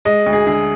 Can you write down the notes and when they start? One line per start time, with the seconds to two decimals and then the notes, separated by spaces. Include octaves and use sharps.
0.05 G#3 D#5
0.26 D2
0.33 G#4
0.47 D3 G#4